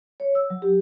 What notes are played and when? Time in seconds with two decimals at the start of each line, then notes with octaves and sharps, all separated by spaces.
0.20 C#5
0.35 E6
0.50 F#3
0.62 G4